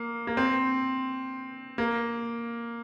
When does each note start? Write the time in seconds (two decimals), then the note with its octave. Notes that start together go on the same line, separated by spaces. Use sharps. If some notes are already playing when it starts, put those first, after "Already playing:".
Already playing: A#3
0.27 A#3
0.37 C4
1.78 A#3